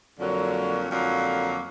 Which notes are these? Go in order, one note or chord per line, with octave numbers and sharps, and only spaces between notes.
F2 D3 F#3 A#3
F2 D3 F#3 A#3